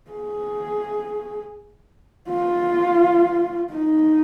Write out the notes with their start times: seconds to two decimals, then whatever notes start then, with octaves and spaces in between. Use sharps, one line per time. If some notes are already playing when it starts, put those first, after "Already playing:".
0.11 G#4
2.29 F4
3.74 D#4